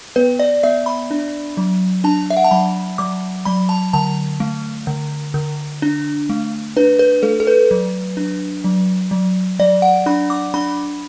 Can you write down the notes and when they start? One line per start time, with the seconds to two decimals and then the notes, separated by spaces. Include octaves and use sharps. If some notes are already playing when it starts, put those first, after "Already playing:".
0.16 B3 B4
0.39 D5
0.63 B3 E5
0.86 B5
1.11 D4
1.57 F#3
2.04 D4 A5
2.30 E5
2.37 F#5
2.44 A5
2.51 F#3 B5
2.98 F#3 D6
3.45 F#3 B5
3.69 A5
3.93 D3 A5
4.40 A3
4.87 D3
5.34 D3
5.82 D4
6.30 A3
6.76 D4 B4
6.99 B4
7.23 A3 A4
7.40 A4
7.47 B4
7.71 F#3
8.17 D4
8.64 F#3
9.11 F#3
9.59 F#3 D5
9.82 F#5
10.06 D4 B5
10.30 D6
10.54 D4 B5